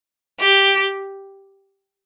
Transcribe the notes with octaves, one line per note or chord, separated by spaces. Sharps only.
G4